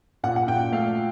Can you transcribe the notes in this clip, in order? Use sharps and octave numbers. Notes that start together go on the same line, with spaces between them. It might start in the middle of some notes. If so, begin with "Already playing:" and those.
A#2 F#5
F#5
A#2 G5
A3 F5